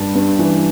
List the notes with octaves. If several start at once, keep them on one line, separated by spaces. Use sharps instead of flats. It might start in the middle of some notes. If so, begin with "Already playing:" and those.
Already playing: G2 G3 A5
G2
E3